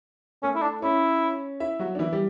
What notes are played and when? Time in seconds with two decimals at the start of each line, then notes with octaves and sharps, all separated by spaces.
0.43 A3 C#4 A4
0.56 E4
0.62 D4
0.82 C#4 E4 C#5
1.60 E4 E5
1.79 F#3 F#4
1.95 D4
1.99 E3 E4
2.12 G3 G4